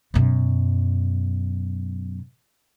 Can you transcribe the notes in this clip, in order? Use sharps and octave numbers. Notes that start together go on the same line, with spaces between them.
F#2 B2